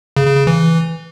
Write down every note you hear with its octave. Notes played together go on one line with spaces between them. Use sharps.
C#3
C#3
C#3
E3